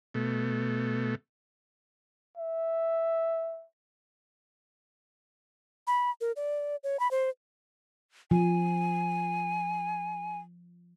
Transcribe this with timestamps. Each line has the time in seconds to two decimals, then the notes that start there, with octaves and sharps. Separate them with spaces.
0.14 B2 A3
2.37 E5
5.87 B5
6.21 A#4
6.36 D5
6.84 C#5
7.00 B5
7.11 C5
8.31 F3 G#5